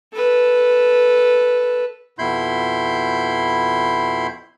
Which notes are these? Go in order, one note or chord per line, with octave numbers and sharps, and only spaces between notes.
A4 B4
F2 B2 E4 B5 C6 G6